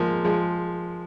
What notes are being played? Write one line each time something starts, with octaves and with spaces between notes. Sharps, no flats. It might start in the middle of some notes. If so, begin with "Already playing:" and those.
Already playing: F3 G#3 A#3
F3 G#3